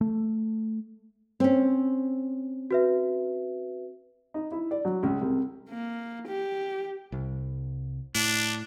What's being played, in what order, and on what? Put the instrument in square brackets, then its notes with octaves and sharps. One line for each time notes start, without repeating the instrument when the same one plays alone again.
[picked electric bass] A3
[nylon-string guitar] C4 C#4
[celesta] F#4 B4 E5
[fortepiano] D#4
E4
D5
F#3
C#2
C2
[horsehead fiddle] A#3
G4
[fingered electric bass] C2
[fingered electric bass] A2 [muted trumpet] D4